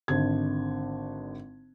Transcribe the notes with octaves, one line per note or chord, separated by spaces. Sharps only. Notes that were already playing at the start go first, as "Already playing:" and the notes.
G#1 D3 G#6